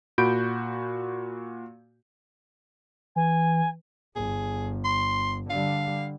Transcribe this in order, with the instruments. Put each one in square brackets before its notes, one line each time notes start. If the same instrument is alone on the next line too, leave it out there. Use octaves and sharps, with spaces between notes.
[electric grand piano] A#2 F#4 B5 G6 D7
[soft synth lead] E3 [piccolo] G#5
[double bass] G1 [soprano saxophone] G#4
[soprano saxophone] C6
[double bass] D3 G3 [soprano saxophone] F5